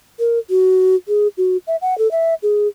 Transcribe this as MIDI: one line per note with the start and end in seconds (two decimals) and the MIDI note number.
0.19 0.39 70
0.50 0.96 66
1.08 1.27 68
1.37 1.57 66
1.67 1.76 76
1.81 1.97 78
1.98 2.10 69
2.11 2.34 76
2.42 2.67 68